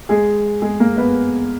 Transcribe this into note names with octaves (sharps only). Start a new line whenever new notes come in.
G#3 G#4
G#3 G#4
A#3 A#4
B3 B4